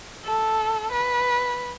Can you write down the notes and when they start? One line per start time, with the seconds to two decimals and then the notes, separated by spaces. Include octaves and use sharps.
0.25 A4
0.92 B4